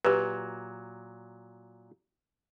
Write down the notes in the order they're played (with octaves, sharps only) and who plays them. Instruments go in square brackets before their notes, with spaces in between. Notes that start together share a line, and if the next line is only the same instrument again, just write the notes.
[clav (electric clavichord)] A#2 F#3 [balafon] G4 B4